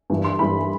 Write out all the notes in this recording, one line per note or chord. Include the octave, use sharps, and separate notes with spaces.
G2 E3
C6
G2 E3 B5